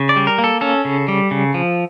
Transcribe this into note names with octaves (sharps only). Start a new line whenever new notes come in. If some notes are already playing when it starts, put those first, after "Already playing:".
Already playing: C#3
D5
G3
A#4
A#3
A4
C#4 A4
C#3
G3
C#3
F3